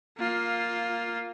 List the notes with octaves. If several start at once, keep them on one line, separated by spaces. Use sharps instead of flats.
A#3 F4